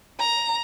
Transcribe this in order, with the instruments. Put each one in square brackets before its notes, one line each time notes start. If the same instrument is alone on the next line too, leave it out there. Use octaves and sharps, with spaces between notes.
[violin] A#5